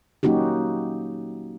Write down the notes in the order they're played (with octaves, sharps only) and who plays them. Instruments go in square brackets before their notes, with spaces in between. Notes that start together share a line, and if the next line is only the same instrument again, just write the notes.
[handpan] F#3 A#3 C#4 D#4 F#4 G4